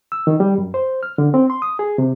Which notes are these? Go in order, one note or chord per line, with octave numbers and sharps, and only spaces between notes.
E6
D#3
G3
F#2
C5
F6
D3
C4
C6
D#6
G#4
C3